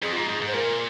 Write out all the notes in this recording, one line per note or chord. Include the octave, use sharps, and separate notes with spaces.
F2 G#4
G#2 F4
G#4
G#2
G#2
C5
A#2 A#4